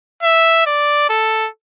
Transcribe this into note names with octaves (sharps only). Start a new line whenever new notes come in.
E5
D5
A4